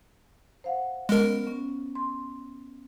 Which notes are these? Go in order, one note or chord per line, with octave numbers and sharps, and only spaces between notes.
C5 F5 F#5
G#3 B3 C#4 A#4
C#4
C6